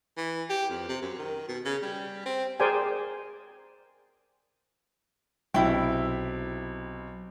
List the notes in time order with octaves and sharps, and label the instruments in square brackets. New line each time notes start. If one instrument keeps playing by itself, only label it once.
[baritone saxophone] E3
G4
F2
C3
F#2
D#3
B2
C#3
G3
C4
[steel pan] G#4 A#4 C5 D5 G5 G#5
[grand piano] B1 C3 [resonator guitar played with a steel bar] E4 G5